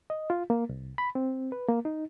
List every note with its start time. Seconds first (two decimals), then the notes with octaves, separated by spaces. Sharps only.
0.10 D#5
0.30 F4
0.50 A#3
0.69 C2
0.98 B5
1.15 C4
1.52 B4
1.68 A#3
1.85 D#4